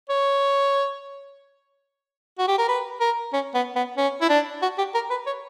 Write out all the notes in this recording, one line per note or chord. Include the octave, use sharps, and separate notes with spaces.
C#5
F#4
G4
A#4
B4
A#4
C#4
B3
B3
C#4
E4
D4
F#4
G4
A#4
B4
C#5